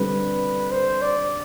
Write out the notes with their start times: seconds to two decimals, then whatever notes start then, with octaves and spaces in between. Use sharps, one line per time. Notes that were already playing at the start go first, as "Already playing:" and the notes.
Already playing: D3 G3 C4 B4
0.71 C5
1.02 D5